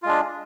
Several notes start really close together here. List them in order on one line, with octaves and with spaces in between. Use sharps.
F4 G#3 D4